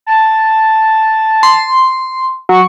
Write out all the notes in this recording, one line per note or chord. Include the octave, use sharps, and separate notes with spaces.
A5
C6
F#3 C#6